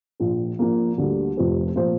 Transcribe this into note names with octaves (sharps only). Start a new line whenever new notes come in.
A#1 A#2 F3
A#1 A#2 F3 A#3
D2 D3 G3 A#3
F1 F2 F3 C4 G4
A#2 F3 A#3 F4 C5